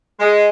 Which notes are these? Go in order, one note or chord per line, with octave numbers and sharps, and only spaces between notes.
G#3